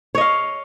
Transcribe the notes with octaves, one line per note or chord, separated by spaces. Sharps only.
C#5 D#5 F5